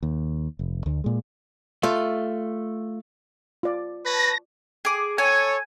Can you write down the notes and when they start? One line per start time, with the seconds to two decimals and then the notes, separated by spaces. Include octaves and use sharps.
0.03 D#2
0.59 F1
0.86 D2
1.04 A#2 G#3
1.83 A3 F4
3.63 F4 D5
4.06 B4 C#5 A5 A#6
4.85 G#4 D6
5.18 A4 C#5 G#5